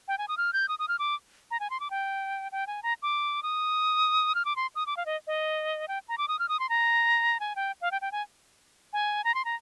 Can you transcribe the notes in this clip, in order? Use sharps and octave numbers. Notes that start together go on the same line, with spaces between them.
G5
G#5
D#6
F6
G6
D#6
D#6
F6
D6
A#5
G#5
C6
D6
G5
G5
G#5
A#5
D6
D#6
F6
D6
C6
D#6
D6
F5
D#5
D#5
G5
A#5
D6
D#6
F6
D#6
C6
A#5
G#5
G5
F5
G5
G5
G#5
G#5
A#5
C6
A#5